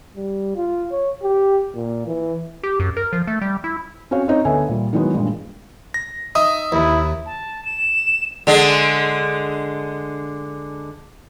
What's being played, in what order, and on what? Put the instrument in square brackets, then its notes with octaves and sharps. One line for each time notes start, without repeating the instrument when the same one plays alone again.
[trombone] G3
F4
C#5
G4
A#2
E3
[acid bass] G4
F#2
A#4
F3
A3
G3
E4
[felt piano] C4 C#4 F#4 C#5 F5
C4 D#4 C#5
D2 B3 A4 C#5 E5 G#5
A#2 G3
D#3 E3 F#3 G#3 B3
G2 A#2 G3 G#3
[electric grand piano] A#6
[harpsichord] D#4 [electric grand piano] E5 D#6
[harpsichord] D#2 [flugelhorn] E4
[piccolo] A5
E7
[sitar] D3 G#3